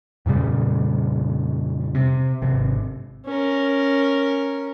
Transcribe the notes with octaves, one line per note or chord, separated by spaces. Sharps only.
F2 A#2 C#3 G3
C3
G#1 C3
C#4 A#4